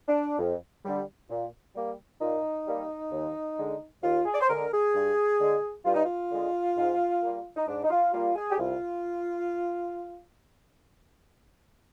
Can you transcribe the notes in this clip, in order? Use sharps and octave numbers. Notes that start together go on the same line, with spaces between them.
D4
F2
D3 G3
A#2
G3 A#3
A#2 D#4
G3 A#3
D#2
D3 G#3
D#2 F4
G#4
D5
C5
D3 G#3 A#4
G#4
G2
D3 G#3
G2 F4
D#4
F4
D3 G#3
G#2
G3 A#3
D#4
G#2 D4
D#4
F4
G3 A#3 F4
G#4
G4
C2 F4